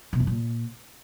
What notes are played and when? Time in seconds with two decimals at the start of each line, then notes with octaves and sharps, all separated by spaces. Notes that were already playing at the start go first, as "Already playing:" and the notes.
0.13 B2
0.20 F#2
0.27 A#2